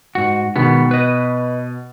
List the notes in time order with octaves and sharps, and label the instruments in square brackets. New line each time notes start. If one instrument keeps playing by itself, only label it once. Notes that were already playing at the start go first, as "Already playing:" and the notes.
[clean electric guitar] G#2 F#4
[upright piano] B2 [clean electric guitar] D#3 G#3 B3
[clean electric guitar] B4 D#5